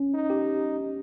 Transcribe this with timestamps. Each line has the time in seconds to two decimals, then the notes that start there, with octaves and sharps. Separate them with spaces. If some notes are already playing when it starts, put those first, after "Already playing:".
Already playing: C#4
0.14 D#4
0.30 G4